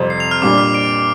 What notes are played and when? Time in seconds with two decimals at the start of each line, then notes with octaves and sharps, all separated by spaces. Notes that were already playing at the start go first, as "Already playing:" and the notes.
Already playing: F2 C3 G3 C4
0.10 C7
0.20 F7
0.31 F6
0.42 A#2 G3 D4 D6
0.58 F6
0.75 D7